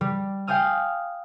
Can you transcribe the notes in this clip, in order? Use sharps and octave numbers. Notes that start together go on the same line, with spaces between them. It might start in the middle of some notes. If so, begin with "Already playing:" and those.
G3
F5 G5 G#5 D#6 F6